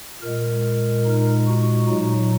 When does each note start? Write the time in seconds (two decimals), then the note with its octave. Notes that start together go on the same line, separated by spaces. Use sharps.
0.22 A#2 G#3 A#4
1.05 D#4
1.47 F#4
1.88 A#2 F#3 D#4